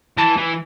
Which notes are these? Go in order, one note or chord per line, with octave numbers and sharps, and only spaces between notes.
E3 A5
E3